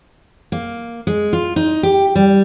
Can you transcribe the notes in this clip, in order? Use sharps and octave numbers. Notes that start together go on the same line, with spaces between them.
A#3
G#3
F4
D#4
G4
G3